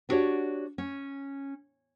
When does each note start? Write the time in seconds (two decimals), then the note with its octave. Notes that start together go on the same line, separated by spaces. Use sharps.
0.09 B3 D4 F#4 G4 C#5 D5
0.78 C#4